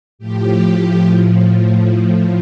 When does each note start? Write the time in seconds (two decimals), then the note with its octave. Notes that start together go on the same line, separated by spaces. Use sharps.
0.19 A2 F3 G4
1.01 A2 F3